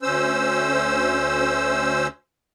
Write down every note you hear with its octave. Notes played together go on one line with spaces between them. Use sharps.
D2 C#4 C5 E6